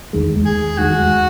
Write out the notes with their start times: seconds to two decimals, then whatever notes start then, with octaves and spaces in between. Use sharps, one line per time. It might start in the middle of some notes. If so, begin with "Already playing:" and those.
0.13 E2 D#3 G#3
0.46 G#4
0.78 E2 D#3 G#3 F#4